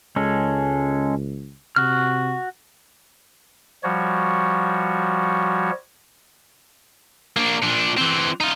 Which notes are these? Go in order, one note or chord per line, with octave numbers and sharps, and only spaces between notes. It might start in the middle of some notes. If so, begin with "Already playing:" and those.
C#2 G#3 C#4 A4
C3 F#4 F6
F3 G3 F#4 C#5
A#3 D4
A#2 D4
E3 C4
D#4 F4